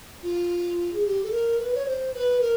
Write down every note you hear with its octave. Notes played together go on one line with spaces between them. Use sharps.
F4
G#4
G4
A4
A#4
B4
C#5
C5
B4
A#4